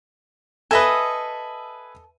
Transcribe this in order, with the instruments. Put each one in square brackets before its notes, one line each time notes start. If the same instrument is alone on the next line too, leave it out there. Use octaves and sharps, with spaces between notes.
[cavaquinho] A4 D#5 [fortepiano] B4 E5 G#5